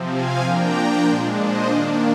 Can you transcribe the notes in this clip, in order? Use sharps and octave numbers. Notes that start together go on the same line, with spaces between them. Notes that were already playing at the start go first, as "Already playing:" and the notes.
Already playing: C3 F3 C4
F5 G#5
F3 A#3 D4 G5 A#5
A#2 G#3 D4 G#5 C6
C5 D#5
D#3 A#3 D4 D5 F5